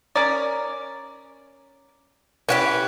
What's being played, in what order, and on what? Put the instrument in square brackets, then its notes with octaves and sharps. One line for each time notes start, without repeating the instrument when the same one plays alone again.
[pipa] C#4 A#4 D5
[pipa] E3 [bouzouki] C#4 F#4 G4 [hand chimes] B4 F#6 B6